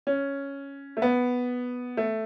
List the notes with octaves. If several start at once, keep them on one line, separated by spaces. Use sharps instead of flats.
C#4
A3
B3
A3